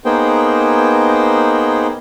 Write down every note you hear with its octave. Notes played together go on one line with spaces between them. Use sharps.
A#3 B3 D#4 G#4 C5 G5